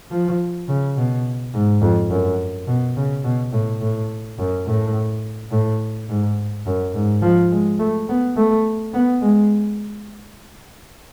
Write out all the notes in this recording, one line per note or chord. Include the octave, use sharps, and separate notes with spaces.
F3
C#3
B2
G#2
F2
F#2
B2
C#3
B2
A2
A2
F#2
A2
A2
G#2
F#2
G#2
F3
G#3
A3
B3
A3
B3
G#3